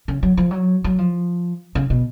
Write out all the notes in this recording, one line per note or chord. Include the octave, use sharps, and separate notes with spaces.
C#3
F#3
F3
F#3
F#3
F3
C#3
B2